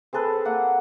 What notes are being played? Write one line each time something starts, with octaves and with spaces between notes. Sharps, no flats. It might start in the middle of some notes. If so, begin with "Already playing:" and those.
C4 G#4 A4 B4
A#3 F#5